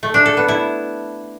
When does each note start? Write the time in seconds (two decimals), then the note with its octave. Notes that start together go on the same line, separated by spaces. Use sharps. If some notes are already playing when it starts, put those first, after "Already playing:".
0.03 A3
0.14 D4
0.26 A4
0.37 B3
0.48 E4